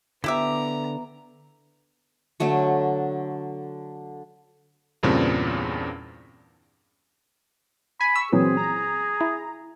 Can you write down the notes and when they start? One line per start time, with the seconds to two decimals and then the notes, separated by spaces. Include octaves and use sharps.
0.24 D3 B3 E4 G4 E5 A#5 D6
2.40 D3 F#3 A3 C#5
5.03 E2 G2 A#2 C#3 C4 D4
8.01 G#5 B5
8.16 C#6 E6
8.32 A#2 E3 F#3 C4 G#4
8.57 A#5
9.21 E4